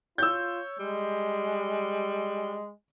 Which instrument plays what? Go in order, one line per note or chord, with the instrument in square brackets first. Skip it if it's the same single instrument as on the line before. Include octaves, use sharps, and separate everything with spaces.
[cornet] F4 [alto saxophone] C#5 [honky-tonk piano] E6 G6
[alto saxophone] G3 [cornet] G#3